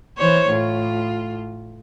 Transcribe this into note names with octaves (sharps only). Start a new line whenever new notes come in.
E3 C5 C#5
A2 F4